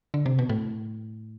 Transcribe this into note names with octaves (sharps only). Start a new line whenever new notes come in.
D3
C3
B2
A2